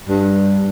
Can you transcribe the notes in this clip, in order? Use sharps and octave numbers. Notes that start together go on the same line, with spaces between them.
G2